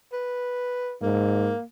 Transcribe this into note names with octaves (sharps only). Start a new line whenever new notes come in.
B4
G#2 A#3